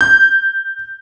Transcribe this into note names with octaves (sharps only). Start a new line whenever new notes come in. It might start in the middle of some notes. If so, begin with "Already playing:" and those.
G6